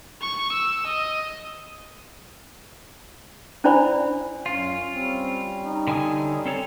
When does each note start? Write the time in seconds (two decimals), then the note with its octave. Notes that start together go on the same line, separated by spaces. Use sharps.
0.21 C#6
0.52 E6
0.87 D#5
3.64 C#4 D4 E4 C5 D5 B5
4.46 F#2 C#4 F4
4.94 G3 C4 C#4
5.64 D#4
5.87 D3 G#5 D#6
6.45 C4 A4 C#5